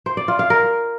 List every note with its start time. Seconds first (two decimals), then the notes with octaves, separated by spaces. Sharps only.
0.06 C5
0.17 D5
0.28 F4
0.39 F5
0.50 A#4